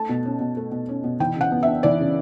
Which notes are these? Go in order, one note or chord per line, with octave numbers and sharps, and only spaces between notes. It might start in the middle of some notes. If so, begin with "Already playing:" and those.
Already playing: A3 A5
B2
C#4
B2
A3
B2
C#4
B2
E3 G5
C#3 F#5
B3
D4 E5
E3 D5
C#3